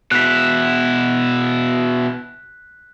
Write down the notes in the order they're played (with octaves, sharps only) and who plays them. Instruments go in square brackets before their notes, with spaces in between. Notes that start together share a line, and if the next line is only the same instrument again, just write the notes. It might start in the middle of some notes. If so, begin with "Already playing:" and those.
[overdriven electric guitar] B2 E4 [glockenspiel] F#6 B6